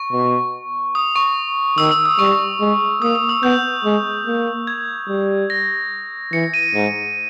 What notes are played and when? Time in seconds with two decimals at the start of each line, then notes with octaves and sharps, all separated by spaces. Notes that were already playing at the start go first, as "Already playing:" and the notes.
Already playing: C#6
0.12 B2
0.95 D#6
1.16 C#6
1.78 D#3 E6
1.91 E6
2.05 D#6
2.19 G3 C#6
2.60 G#3
3.02 A#3 D#6
3.15 D#6
3.29 E6
3.43 B3 G6
3.84 G#3
4.26 A#3
4.67 G#6
5.08 G3
5.50 A#6
6.33 E3 C#7
6.54 D#7
6.74 G#2